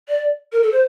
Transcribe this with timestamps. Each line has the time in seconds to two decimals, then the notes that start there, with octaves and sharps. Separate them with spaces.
0.08 D5
0.52 A#4
0.62 A4
0.72 C5